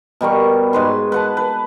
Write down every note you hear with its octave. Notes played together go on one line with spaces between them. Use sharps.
B2 G3 A#4 C#6
G#2 B4 C6
B4 F#5 A5
B4